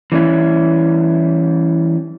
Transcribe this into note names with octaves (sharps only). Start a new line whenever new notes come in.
E3 G3 C#4 E4